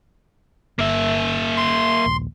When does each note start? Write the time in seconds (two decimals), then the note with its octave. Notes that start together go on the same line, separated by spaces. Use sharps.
0.79 G1 A#3 E5
1.57 C6
2.06 D#1 A#1 D#2